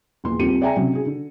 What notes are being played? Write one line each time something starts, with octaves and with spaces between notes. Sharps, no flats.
E1 A#1 C6
D#1 C4 F4 G4 C#7 D#7
G#4 D5 E5 G5 G#5 A#5
C3 F#3 C#4
C#4 F#4 G#4
D3